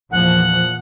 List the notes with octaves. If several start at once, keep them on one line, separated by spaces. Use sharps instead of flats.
E2 A#2 F3 F#5